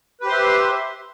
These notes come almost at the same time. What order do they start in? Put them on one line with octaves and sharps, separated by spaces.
B4 G4 C5 C6 E5